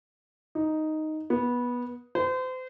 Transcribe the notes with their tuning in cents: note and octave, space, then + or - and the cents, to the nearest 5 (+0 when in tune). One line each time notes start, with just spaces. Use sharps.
D#4 +0
B3 -15
C5 -35